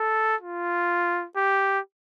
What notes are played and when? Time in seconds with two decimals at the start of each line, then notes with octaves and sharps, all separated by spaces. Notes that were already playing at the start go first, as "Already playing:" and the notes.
Already playing: A4
0.41 F4
1.37 G4